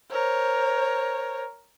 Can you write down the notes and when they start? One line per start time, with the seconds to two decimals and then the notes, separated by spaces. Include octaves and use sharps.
0.11 A#4 C5 C#5